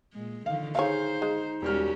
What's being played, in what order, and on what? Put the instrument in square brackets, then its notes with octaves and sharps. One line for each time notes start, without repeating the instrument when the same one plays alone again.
[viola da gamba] A#2 G#3
[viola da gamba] D3 D#3 F3 [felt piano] F5
[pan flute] D#4 [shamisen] E4 C#5 [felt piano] G#4 F5 [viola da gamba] C5
[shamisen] G#3
[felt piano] E1 G3 F6 [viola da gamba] C#4 F#4 G4